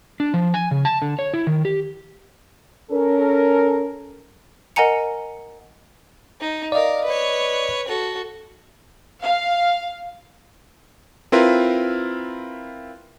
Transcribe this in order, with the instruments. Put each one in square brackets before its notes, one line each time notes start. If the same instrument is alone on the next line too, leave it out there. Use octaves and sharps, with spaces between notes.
[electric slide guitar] D4
F3
G#5
C#3
A5
D3
C#5
E4
D#3
G4
[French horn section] C#4 A4 A#4
[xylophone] A#4 D#5 F#5 G#5 A#5 C#7
[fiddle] D#4
[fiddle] A#4 F5 [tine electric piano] D5 D#5
[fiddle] B4 C#5
F#4 A4
[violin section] F5
[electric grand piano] C4 E4 F4 A#4 B4